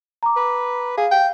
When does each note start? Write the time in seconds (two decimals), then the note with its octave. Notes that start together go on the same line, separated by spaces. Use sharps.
0.23 A#5 D6
0.36 B4
0.98 G#4 F5
1.11 G5